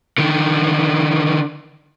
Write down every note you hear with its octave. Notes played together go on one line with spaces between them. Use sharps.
D3 D#3